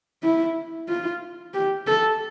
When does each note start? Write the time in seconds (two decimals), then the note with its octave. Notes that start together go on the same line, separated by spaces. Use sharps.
0.23 E4
0.88 F4
1.54 G4
1.87 A4